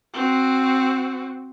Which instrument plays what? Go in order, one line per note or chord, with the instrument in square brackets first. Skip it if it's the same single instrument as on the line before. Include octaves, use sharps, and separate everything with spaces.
[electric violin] C4 F#4